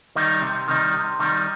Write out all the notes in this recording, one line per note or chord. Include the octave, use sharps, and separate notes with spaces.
D#3 G3 D#4
C3
D#3 G3 D#4
C3
D#3 G3 D#4